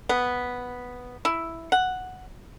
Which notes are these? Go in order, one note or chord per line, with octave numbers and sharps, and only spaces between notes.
B3
E4
F#5